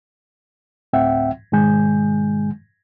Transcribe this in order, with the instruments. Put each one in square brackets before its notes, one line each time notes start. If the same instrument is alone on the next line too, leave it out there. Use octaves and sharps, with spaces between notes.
[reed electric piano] D2 A2 C4 E5 F#5 G5
G#2 B2 D#3 G#3 G#5 G6